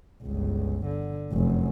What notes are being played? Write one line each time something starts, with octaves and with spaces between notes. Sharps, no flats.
G1 C#2
D3
F1 F#2